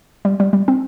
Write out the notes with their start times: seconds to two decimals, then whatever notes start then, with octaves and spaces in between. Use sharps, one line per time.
0.25 G3
0.40 G3
0.53 G3
0.68 C4